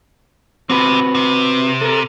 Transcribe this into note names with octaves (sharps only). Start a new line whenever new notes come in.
C3 C4 F#4 B4
C3
A4 A#4